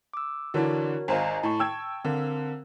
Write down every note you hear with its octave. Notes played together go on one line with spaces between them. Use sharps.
D6 E6
D3 E3 D4 F#4 A#4 C#5
G#1 C5 D#5 F5 G#5 A#5
A2 A5 C#6
G5 E6 G#6
D3 C4 A#4 F5